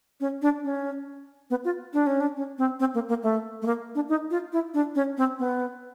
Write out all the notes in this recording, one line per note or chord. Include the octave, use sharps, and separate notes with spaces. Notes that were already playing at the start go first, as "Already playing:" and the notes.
C#4
D4
C#4
B3
F4
D4
C#4
D4
C#4
C4
C4
A#3
A#3
A3
A3
A#3
D4
D#4
F4
E4
D4
C#4
C4
B3